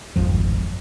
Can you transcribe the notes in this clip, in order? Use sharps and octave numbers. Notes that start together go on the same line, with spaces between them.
D1 G#1 F2 F3